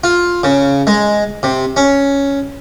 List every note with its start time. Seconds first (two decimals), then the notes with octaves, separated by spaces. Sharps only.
0.04 F4
0.43 C#3
0.87 G#3
1.43 C3
1.77 C#4